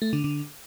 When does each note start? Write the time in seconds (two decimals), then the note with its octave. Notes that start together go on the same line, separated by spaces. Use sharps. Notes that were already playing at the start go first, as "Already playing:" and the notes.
0.02 A3
0.13 D3
0.24 D3